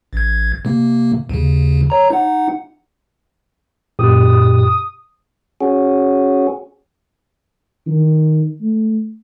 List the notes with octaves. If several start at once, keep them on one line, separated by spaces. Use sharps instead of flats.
A1 G#6
C3 A#3
D#2 C#3
C#5 A#5
D#4 F#5
F#2 A#2 G4 D#6
C#4 F#4 G#4
D#3
A3